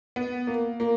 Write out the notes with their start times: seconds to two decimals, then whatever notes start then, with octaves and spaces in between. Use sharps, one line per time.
0.16 B3
0.47 A#3
0.80 A#3